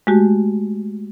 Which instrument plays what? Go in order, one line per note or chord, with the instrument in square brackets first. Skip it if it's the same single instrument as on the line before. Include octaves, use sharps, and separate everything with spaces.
[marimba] G#3 A3 F#4 G4